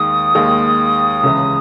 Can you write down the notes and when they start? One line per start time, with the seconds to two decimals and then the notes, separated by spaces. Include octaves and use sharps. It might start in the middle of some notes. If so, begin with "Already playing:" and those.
Already playing: D#2 D#3 G#3 D#6
0.35 D#2 D#3 G#3
1.23 C#2 C#3 E3 G#3